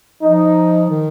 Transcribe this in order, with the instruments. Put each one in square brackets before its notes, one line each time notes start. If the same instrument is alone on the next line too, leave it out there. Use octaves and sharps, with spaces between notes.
[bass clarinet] F3 [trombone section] D#4
[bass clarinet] D#3